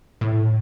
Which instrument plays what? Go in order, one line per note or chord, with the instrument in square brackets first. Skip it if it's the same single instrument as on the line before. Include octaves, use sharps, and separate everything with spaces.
[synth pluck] A2